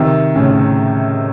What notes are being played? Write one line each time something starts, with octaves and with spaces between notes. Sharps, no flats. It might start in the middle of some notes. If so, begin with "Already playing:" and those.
Already playing: C3 D#3
A2 C#3